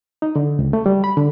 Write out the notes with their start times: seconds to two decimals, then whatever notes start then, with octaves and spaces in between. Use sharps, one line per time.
0.22 D#4
0.36 D3
0.59 C#2
0.73 A3
0.86 G3
1.04 B5
1.17 D3